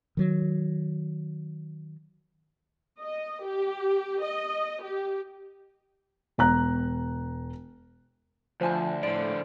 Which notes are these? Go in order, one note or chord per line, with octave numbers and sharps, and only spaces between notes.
D#3 F#3
D#5
G4
D#5
G4
E1 A#5 F#6
D2 F3 C5 G#5 A5
A2 D3 F3 D5 D7